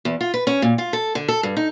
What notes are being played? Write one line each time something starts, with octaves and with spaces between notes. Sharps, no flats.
E2
F4
B4
C#4
A#2
F4
A4
D3
A4
G2
D#4